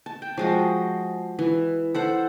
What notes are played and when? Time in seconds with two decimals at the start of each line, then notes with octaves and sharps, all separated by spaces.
0.06 A5
0.22 G5
0.37 F3 G#3 F#4
1.39 E3
1.95 A4 C5 F#5